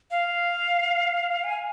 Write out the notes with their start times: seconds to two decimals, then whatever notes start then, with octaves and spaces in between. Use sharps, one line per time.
0.11 F5
1.44 G#5